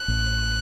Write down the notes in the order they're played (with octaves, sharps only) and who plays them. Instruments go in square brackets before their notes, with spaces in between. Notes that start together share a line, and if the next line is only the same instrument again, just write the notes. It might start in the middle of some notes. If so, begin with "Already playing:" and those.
Already playing: [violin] F#6
[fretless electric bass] A1